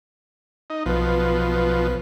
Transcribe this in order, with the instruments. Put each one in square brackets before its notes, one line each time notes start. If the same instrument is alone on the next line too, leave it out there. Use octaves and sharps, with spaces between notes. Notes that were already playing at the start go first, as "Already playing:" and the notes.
[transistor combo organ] D#4
[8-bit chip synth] B1 B4 [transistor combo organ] B2 F3